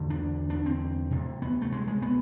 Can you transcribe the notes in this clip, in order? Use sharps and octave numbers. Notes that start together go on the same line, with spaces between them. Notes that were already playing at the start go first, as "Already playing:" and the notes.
Already playing: E2 D3
D4
D4
C4
D2 C3
B3
A3
G#3
G#3
B3